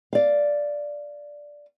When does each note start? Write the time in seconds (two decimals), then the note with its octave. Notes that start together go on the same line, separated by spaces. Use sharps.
0.13 D5 F5